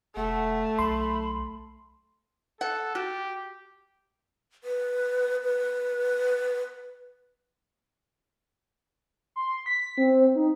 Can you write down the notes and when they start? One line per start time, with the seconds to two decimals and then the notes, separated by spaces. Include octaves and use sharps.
0.16 E1 A3 F#5
0.79 B1 B5 C6
2.61 A4 F#5
2.95 F#4 G4
4.64 B4
5.42 B4
9.36 C6
9.66 B6
9.98 C4
10.35 D#4